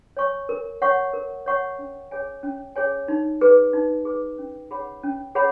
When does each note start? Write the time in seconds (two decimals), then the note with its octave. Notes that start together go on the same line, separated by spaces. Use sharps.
0.17 C#5 G#5 C#6
0.49 A#4
0.82 C#5 F#5 C#6
1.13 A#4
1.46 C#5 F#5 C#6
1.79 C#4
2.11 G#4 C#5 G#5
2.43 C#4
2.76 G#4 C#5 G#5
3.08 D#4
3.41 G#4 B4
3.73 D#4
4.05 G#4 B4
4.38 C#4
4.71 G#4 C#5 F#5 B5
5.03 C#4
5.35 G#4 C#5 F#5 B5